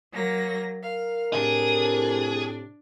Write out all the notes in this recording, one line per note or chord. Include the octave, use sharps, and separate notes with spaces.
F#3 A#3 A#6
A#4 F5
A2 C3 D4 G#4